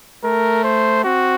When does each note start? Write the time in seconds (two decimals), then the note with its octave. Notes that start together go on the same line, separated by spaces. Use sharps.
0.24 A3 A#4
0.64 C5
1.04 C4 F#4